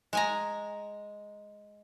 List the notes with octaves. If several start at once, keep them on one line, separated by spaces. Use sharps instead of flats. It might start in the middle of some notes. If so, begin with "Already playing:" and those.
G#3 G#5 A#5